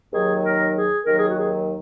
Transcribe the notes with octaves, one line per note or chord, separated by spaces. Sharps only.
D#2 D#3 F#3 G#4
A#4
G#4
D#2 D#3 F#3 A#4
G#4
F#4
G#4